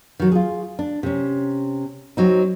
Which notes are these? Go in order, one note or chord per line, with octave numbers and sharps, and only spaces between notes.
D#3 F#3
F4 G#4
D4
C3 C#4
F#3 C4 D#4